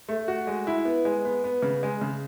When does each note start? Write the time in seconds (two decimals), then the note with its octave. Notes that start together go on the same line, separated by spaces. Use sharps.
0.09 A3
0.28 F#4
0.47 G#3
0.67 E4
0.85 B3
1.05 G#3
1.25 B3
1.44 B3
1.62 C#3
1.83 G#3
2.01 C#3